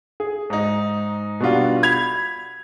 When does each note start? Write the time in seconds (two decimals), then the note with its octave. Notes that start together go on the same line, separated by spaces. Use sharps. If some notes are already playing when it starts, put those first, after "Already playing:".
0.20 G#4
0.50 G#2 D#4
1.40 B2 G3 D4 F4 F#4
1.83 B5 G#6 B6 F7